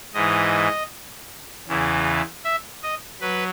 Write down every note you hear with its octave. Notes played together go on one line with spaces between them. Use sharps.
G#2 E3 D#5
E2 C#3 E3
E5
D#5
F#3 B4